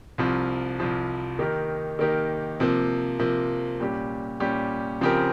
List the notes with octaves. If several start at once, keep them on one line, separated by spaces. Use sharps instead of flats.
C2 C3 F3
C2 C3 F3
D#3 A#3 D#4 G4 A#4
D#3 A#3 D#4 G4 A#4
C3 F3 A#3
C3 F3 A#3
A#2 G3 C#4 G4
A#2 G3 C#4 G4
C#3 F3 C4 G4 A#4